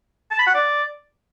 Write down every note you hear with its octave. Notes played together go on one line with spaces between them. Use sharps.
A5
B5
F#5
D5